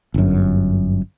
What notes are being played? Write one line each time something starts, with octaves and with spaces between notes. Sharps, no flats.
G1 F#2